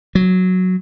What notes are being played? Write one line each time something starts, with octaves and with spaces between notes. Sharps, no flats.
F#3